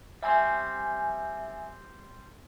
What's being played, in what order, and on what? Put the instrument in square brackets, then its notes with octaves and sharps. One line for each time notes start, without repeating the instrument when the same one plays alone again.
[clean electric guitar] G3 C4 [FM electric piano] E5 G#5